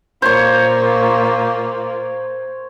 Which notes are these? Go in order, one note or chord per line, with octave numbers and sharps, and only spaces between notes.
A#2 A#3 F4 C5 C#5